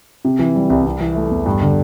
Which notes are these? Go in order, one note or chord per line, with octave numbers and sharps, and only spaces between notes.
C3
E3
G3
C2
C3
E3
A3
E2
G2
D3